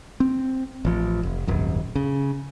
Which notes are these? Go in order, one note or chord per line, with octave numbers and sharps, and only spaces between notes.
C4
A1 F3
F1
D#1 G#1 F#2
C#3